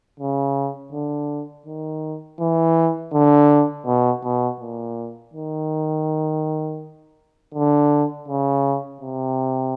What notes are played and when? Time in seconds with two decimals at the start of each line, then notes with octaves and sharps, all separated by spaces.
0.20 C#3
0.92 D3
1.66 D#3
2.40 E3
3.13 D3
3.86 B2
4.24 B2
4.60 A#2
5.33 D#3
7.54 D3
8.28 C#3
9.01 C3